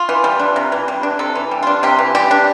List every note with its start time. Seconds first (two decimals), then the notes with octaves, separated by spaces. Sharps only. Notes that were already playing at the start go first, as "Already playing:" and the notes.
Already playing: F4
0.09 E3
0.24 G3
0.39 D4
0.56 C3
0.72 E3
0.88 G3
1.03 D4
1.19 C3 A4
1.35 E3
1.51 G3
1.63 D4 F4
1.83 C3 G4
1.99 E3
2.15 G3 G4
2.31 D4